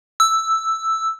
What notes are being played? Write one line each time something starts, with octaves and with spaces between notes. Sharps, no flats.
E6